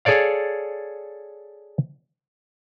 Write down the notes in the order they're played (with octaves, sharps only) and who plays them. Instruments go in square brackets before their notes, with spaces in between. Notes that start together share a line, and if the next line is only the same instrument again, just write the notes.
[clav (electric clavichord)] G#4 A4 C#5 D5 F5